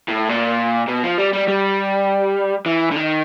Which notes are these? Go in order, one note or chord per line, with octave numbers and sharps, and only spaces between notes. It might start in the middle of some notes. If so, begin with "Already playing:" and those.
A2
A#2
B2
F3
G3
G3
G3
E3
D3
D#3